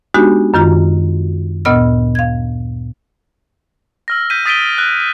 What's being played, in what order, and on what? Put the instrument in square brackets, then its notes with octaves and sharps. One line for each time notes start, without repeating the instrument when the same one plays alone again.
[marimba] G#3 B3 D4 D#4 F#4 G4
F#2 D#3 F4 A#5
D2 A#2 B3 D#5 E6 F6
F5 G#6
[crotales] E6 F6 A#6
G6 B6 D#7
D#6 A6 B6 D7 D#7 G7
F#6